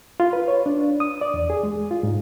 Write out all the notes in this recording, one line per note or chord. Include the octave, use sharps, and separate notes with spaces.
F4
B4
C#5
D4
D#6
D5
E2
G#4
G#3
F4
G#2